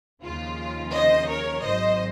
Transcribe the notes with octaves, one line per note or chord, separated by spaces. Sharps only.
D#2 C#3 F3 F4
C5 D#5
A#4 C#5
G#1 G#2 F#3 C5 D#5